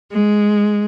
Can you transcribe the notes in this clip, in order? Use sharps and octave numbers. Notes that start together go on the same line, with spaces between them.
G#3